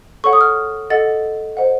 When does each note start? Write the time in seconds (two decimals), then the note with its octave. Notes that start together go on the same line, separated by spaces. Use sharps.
0.24 A4 C#5 F#5 C#6
0.33 D#6
0.41 F6
0.90 A4 D#5 F#5 A6
1.57 C5 D#5 F#5